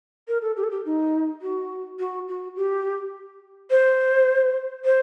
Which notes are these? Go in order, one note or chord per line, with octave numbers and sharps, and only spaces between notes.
A#4
A4
G4
A4
G4
D#4
F#4
F#4
F#4
G4
C5
C5